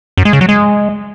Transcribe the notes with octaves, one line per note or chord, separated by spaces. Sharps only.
F#2
G#3
C#3
F#3
G#3